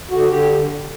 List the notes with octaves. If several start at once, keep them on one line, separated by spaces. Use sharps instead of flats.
D3 F#4
D3 G4